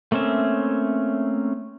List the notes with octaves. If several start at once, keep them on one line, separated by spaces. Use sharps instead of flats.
A3 A#3 C4 C#4 E5